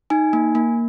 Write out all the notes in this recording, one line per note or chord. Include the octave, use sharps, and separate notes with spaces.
D#4 G#5
A#3
A#3